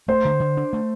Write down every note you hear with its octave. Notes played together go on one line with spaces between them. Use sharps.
A3 C5
D3
D3
D4
A3